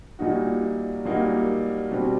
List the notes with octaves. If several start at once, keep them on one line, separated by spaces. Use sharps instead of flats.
A#2 G3 A#3 D#4 F#4
A#2 G3 A#3 D#4 F#4
B2 G3 C4